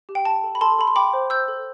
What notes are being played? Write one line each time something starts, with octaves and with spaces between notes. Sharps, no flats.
G4
G5
G5 A5
A4
B5
A4 A5 C6
A4 B5
C6
G5 B5 D6
C5
C5 E6 G6
A4